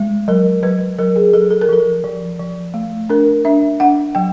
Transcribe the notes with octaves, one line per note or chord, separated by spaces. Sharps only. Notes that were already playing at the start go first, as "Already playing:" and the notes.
Already playing: G#3
F#3 A#4
F#3 B4
F#3 A#4
G#4
F#3 A4
A4
A#4
F3 A4
F3
F3
A3
D4 A#4
D4 E5
D4 F#5
F#3 G5